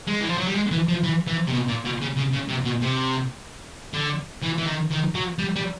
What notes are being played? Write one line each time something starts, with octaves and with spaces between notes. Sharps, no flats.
G#3
E3
F3
F#3
G3
G#3
E3
F3
E3
E3
C3
B2
A#2
B2
C#3
C#3
C#3
C3
B2
C3
D3
E3
E3
D#3
D#3
F#3
G3
G3